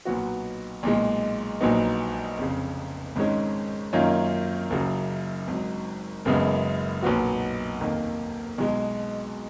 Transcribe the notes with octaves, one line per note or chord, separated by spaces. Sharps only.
B1 A#2 F#3 B3 F#4
B1 A#2 G#3
A#1 A#2 F#3 B3 D#4
F1 F2 C#3
G#1 G#2 D#3 G#3 C#4
F#2 D#3 A#3 C#4 F4
F#1 F#2 C#3 F#3
G#1 G#2 F#3
F#1 F#2 C#3 G#3 B3
B1 A#2 F#3 B3 F#4
F1 D#2 D#3 A#3
B1 B2 G#3